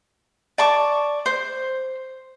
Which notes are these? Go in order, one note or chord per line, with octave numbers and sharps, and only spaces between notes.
D5 A5 C#6 D6
C5